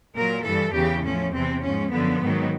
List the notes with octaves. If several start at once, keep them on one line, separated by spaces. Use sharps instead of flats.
A#2 F#3 A#4
G2 E3 A4
E2 C#3 E3 G4
A2 F3 C#4
E2 C3 E3 C4
G#2 F3 C#4
F#2 D3 F3 B3
G#2 D#3 F#3